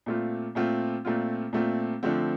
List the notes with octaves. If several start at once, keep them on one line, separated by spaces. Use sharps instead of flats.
A#2 A3 C4 F4
A#2 A3 C4 F4
A#2 A3 C4 F4
A#2 A3 C4 F4
D3 F3 A3 C4